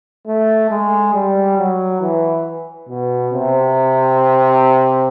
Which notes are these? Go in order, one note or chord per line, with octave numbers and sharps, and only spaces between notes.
A3
G#3
G3
F#3
E3
B2
C3